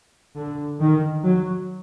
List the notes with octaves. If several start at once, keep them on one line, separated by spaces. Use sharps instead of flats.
D3
D#3
F#3